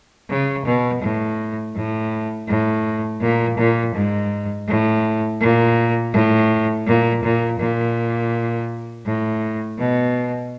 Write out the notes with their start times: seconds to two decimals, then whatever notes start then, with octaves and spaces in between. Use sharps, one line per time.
0.30 C#3
0.66 B2
1.02 A2
1.75 A2
2.48 A2
3.21 A#2
3.58 A#2
3.95 G#2
4.68 A2
5.40 A#2
6.13 A2
6.87 A#2
7.23 A#2
7.59 A#2
9.06 A2
9.78 B2